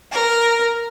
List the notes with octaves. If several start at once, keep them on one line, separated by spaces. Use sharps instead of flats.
A#4